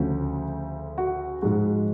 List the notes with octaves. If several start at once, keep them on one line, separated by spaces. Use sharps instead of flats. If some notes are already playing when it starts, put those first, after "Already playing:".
Already playing: D2 C#3 F3 A3 F#4
F#4
G#2 F3 G#3 F#4